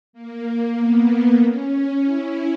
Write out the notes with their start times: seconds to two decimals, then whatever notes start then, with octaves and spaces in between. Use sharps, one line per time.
0.13 A#3
0.77 B3
1.40 C#4
2.04 E4